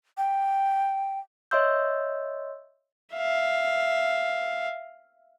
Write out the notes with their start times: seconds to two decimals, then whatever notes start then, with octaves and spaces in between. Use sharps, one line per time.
0.18 G5
1.51 C#5 D#5 E5 C6 E6 G6
3.14 E5 F5